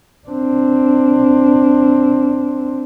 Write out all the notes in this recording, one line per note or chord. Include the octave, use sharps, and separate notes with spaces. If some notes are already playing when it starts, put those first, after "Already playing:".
C4 D4